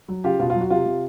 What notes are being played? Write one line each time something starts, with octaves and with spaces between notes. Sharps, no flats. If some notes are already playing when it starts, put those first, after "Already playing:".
F#3
C#3 F4 G4
B2 F4
F4
F#3
F#4
C3 F4
C3